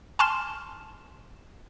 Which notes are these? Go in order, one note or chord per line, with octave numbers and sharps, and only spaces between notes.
G#5 A5 C6 F6 E7